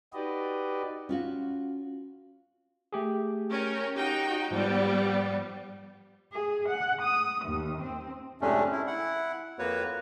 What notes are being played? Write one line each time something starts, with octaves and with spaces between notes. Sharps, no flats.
D#4 F#4 G4 B4 D5 D#5
C#4 F4 F#4
A3 G4 G#4
C#4 A#4 G5
D#4 F#4 G4 G5
G#2 F3 G3 B3
G#4
F#5
D#6
D#2
C4
F2 G#2 C3 A3 C#4 D4
E4
E4 F#5
F2 A#3 F#4 B4 C#5